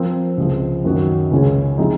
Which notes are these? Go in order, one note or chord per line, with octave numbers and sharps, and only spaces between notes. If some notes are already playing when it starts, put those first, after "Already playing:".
Already playing: F3 C4 F4 A#4
C#2 C3 F3
F#2 D#3 F#3 C#4 F#4
C#2 C#3 G#3 C#4 G#4
C3 F3 G#3 D#4